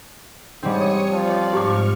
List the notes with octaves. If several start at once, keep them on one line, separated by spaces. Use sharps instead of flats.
G#2 G3 C4 C#5 D#6 C#7
F3 D5
G#2 G4 C#6 D6 F6